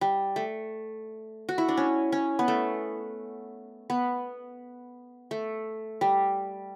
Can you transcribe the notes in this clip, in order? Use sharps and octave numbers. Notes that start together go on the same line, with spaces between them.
G3
A3
F#4
E4
D4
C#4
C#4
B3
A3
B3
A3
G3